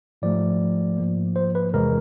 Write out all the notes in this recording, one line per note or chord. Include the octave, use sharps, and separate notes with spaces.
G#2 F3 A3 D5
G#2 F3 A#3
C5
B4
E2 C3 E3 G#3 A#4